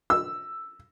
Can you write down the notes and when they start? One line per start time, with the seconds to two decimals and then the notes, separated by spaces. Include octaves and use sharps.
0.10 E6